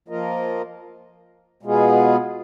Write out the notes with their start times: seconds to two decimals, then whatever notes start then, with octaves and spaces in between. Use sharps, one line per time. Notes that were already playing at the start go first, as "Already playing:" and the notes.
0.08 F3 A#3 F4 A#4 D#5
1.63 B2 G#3 B3 F4 G#4